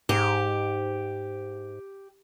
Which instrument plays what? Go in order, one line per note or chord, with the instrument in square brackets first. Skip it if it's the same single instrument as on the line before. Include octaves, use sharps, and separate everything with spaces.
[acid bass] G#2 [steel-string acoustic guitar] G4